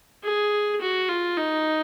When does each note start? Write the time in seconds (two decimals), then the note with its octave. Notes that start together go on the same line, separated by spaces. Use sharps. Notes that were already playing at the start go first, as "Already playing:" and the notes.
0.23 G#4
0.81 F#4
1.09 F4
1.37 D#4